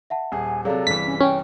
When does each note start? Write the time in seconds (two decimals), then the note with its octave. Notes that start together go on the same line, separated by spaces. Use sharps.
0.10 E5 F#5 A5
0.32 D#1 G#4 G#5
0.65 C3 F#3 G#4 A4 D5 F5
0.87 G1 C3 E3 B6
1.06 C#4
1.21 C#4 G5